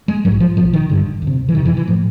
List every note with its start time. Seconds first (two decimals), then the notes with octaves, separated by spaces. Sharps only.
0.08 G#3
0.25 A#1 G#2 F#3
0.40 F3
0.57 B1 B2 F3
0.73 D#3
0.90 G1 G2 D3
1.22 D2
1.27 C3
1.49 E3
1.55 F#1 F2 C3 D#3
1.65 E3
1.77 E3
1.88 A2 F3